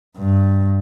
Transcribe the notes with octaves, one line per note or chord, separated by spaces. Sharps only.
G2